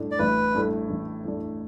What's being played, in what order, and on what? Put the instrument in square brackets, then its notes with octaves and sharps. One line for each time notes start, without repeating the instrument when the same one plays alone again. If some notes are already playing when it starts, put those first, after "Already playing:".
Already playing: [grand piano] A2 A3 D4
[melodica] D5
[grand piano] A1 [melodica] B4
[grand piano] A2 A3 D4
A1
A2 A3 D4